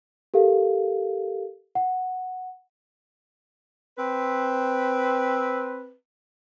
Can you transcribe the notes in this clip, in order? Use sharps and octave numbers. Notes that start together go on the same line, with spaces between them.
G4 A4 A#4 F5
F#5
C4 B4